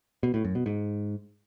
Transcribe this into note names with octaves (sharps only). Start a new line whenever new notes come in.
B2
A2
F#2
B2
G#2